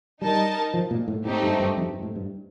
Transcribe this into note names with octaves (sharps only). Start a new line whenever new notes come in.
G3 D#4 A#4 D#5 A5
F3
A#2
A2
A2 A3 C4 D#4 G4
G2
G2
F2
G2
A2
G2